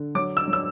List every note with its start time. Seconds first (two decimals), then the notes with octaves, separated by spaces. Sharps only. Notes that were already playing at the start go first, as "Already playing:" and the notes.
Already playing: D3
0.15 F#3 D6
0.37 E6
0.48 F#3
0.53 E6